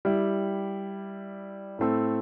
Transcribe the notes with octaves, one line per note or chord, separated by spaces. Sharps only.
G3 E4 G4
A2 A3 C4 A4